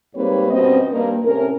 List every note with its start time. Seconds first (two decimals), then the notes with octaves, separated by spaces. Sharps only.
0.15 G#2 G3 A#3 C4 B4 C#5
0.50 G2 B2 C4 C#4 D#5
0.92 G2 A#3 A#4
1.24 A2 C3 C#4 A#4